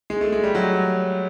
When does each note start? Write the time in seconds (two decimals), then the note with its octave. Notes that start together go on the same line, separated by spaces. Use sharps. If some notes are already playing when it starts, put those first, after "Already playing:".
0.10 G#3
0.21 A3
0.32 G#3
0.44 G3
0.55 F#3